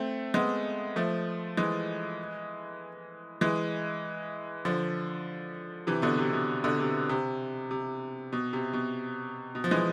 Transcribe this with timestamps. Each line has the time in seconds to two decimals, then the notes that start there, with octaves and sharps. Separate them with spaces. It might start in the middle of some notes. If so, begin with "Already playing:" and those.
Already playing: A3 C4
0.34 G#3 B3
0.96 F3 A3
1.57 E3 G#3
3.41 E3 G#3
4.65 D3 F3
5.87 C3 E3
6.02 B2 D3
6.18 C3
6.33 B2
6.64 B2 D3
6.80 C3
7.09 C3
7.71 C3
8.33 B2
8.53 C3
8.73 B2
9.55 B2
9.64 F3
9.71 E3 G#3